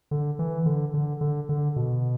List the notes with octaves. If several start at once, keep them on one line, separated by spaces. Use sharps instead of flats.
D3
E3
D3
D3
D3
D3
B2